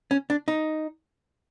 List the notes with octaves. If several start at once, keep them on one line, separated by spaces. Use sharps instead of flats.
C#4
D4
D#4